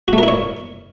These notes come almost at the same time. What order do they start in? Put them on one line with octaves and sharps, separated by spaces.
F#4 A3 A#4 E4 C#5